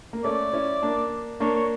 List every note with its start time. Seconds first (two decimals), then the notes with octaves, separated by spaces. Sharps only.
0.13 A#3
0.24 A3 C#4 D5
0.53 C#4 E4
0.82 A#3 D4
1.40 A#3 D4 C#5
1.55 C#5